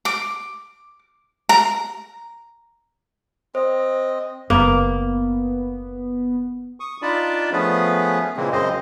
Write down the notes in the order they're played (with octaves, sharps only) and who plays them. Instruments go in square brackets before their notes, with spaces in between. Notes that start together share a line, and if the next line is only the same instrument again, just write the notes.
[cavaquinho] D6
A#5
[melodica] C4 D#5 [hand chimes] C5
[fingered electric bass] F#1 [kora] A#3 [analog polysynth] B3
[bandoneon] C#6 D#6
D4 D#4 F4 D5 A5 B5
F3 A3 B3 C#4 G#4 B4
A#2 C#3 E3 G#3 A#3 C4
F#2 C#3 C4 C5 D#5